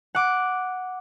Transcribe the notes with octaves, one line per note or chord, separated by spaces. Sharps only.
F#5 D6